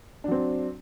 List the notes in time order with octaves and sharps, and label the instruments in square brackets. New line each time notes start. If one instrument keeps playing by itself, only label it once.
[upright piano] D4
F#3
C4